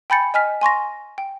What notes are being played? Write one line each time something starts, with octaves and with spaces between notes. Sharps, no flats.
G5 G#5 B5 G6 A6 C#7
D#5 G#5 F6 B6
G#5 C6 C#6 A#6
G5